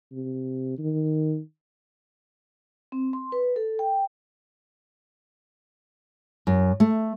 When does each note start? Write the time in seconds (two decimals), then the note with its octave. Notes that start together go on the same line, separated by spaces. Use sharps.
0.12 C3
0.79 D#3
2.92 C4
3.13 C6
3.32 B4
3.56 A4
3.79 G5
6.47 F#2
6.80 A3